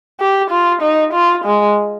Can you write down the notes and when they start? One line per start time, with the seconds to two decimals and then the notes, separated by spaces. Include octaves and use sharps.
0.20 G4
0.51 F4
0.82 D#4
1.13 F4
1.45 G#3